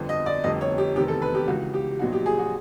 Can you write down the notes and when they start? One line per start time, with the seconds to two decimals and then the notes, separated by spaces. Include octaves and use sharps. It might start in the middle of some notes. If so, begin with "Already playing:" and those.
Already playing: G1 F2 D3
0.09 D#5
0.26 D5
0.44 F1 F2 D3 G3 D#5
0.61 C#5
0.78 G4
0.95 F1 E2 C3 D#3 G4
1.08 A4
1.22 B4
1.35 G4
1.48 C#2 C#3 E3 F#4
1.74 G4
1.99 A#1 A#2 F#3 B3 D#4 F#4
2.13 G4
2.26 G#4
2.39 F#4